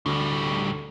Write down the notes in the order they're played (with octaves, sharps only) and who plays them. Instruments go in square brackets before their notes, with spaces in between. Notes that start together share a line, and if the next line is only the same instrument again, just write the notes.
[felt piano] D2 [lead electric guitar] A2 G3